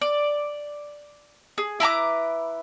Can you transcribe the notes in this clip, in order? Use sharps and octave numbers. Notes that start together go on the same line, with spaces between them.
D5
G#4
E4 B4 A#5 D6